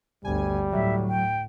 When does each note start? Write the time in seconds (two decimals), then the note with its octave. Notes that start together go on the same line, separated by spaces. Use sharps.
0.25 G1 D2 G3 G#5
0.73 A2 F#3 E5
1.08 G5